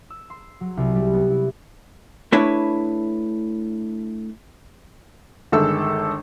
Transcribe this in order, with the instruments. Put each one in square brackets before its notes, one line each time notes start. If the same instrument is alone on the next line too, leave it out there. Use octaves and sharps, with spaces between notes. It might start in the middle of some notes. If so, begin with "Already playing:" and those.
[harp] E6
C6
F#3
C2
G3
B3
E4
[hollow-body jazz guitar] A3 D4 E4 B4 C#5
[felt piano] G1 D#3 G#3 A4 E6